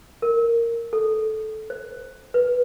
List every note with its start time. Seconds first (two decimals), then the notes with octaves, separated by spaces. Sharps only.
0.22 A#4
0.93 A4
1.70 C5
2.34 B4